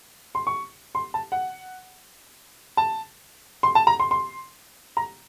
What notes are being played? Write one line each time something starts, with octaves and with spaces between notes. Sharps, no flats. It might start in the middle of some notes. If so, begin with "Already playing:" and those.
C6
C#6
C6
A5
F#5
A5
C6
A5
A#5
C6
C6
A#5